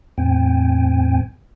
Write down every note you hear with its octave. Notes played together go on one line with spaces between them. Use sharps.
E2 A2 C4 G5 G#5